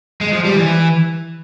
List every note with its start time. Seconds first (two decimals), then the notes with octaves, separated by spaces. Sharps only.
0.21 G#3
0.33 F3
0.45 G3
0.57 E3